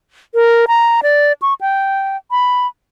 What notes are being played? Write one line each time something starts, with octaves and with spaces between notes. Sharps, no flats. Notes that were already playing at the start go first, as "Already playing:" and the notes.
A#4
A#5
D5
C#6
G5
B5